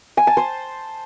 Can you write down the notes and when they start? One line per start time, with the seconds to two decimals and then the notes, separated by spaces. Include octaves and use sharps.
0.17 G#5
0.27 A5
0.37 C5